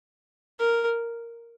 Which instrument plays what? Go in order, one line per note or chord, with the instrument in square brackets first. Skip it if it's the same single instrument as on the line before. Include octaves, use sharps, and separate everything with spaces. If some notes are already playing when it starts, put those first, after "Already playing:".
[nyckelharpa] A#4